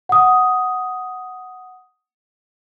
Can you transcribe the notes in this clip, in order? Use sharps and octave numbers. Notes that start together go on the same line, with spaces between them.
F#5 D#6